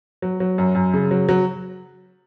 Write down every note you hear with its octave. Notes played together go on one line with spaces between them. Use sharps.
F#3
F#3
F#2
F#2
C#3
F#3
F#3